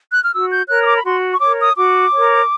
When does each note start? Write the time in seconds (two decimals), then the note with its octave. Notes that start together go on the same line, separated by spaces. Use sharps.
0.12 F#6
0.23 F6
0.33 F#4 E6
0.51 G6
0.69 A#4 C#5 F#6
0.83 D#6
0.87 D6
0.96 B5
1.05 F#4 C6
1.33 C#6
1.41 A#4 C#5 D6
1.59 D#6
1.76 F#4 D6
2.12 A#4 C#5